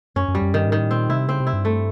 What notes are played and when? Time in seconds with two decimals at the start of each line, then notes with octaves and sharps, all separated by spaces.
0.16 F#2 C#4
0.28 F#2
0.35 G3
0.42 F#2
0.53 G2 D#3
0.67 G#2
0.72 D#3
0.79 A2
0.91 A#2 C4
1.09 C3 E4
1.28 C#3 C4
1.40 C3
1.47 E4
1.53 G2
1.65 A3